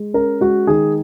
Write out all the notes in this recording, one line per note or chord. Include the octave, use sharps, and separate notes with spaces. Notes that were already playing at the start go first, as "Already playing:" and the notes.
Already playing: G#3
C#4 A#4
G#3 F#4
D#3 G#4